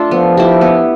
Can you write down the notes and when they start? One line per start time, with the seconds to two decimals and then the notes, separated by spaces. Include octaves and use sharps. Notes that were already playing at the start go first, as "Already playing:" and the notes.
Already playing: A3 D4 F4 A4
0.11 F3 B3
0.37 E4 G4
0.61 B3